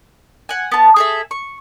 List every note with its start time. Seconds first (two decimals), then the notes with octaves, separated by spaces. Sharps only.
0.49 F#5 G#5
0.71 B3 A5
0.96 G#4 A4 E5
1.31 C#6